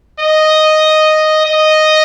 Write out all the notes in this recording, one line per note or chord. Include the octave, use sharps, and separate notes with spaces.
D#5
D#5